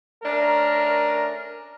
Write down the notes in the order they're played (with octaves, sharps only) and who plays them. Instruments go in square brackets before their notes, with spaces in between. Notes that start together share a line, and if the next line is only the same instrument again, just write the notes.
[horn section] A3 C#4 D4 A#4